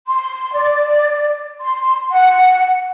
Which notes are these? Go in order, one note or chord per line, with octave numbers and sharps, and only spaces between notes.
C6
D5
C6
F#5